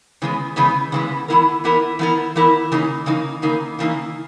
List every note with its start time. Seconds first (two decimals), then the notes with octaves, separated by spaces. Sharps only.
0.22 C#3 E3 G#3 B3
0.56 C#3 E3 G#3 B3
0.92 C#3 E3 G#3 B3
1.28 E3 B3 E4 A#4
1.64 E3 B3 E4 A#4
1.99 E3 B3 E4 A#4
2.36 E3 B3 E4 A#4
2.72 C#3 E3 A#3 D#4
3.06 C#3 E3 A#3 D#4
3.42 C#3 E3 A#3 D#4
3.79 C#3 E3 A#3 D#4